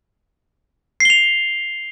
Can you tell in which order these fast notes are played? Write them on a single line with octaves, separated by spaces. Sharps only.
C7 G7 F7